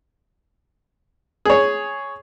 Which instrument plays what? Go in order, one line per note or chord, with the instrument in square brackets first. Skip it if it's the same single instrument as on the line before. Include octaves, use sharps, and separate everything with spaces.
[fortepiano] G#4 C#5